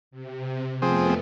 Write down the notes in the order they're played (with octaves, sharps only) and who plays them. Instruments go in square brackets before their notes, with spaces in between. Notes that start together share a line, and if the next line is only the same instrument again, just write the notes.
[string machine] C3
[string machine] F2 A3 B3 [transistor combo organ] F3 C4 G#4